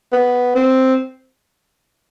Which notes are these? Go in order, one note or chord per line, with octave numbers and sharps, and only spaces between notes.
B3
C4